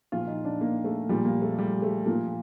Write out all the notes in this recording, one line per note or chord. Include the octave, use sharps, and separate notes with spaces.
A#2 F3 F4
D#4
D4
A#3
A3
A#2 F3 G3
A#3
A3
G3
A3
A#2 F3 A#3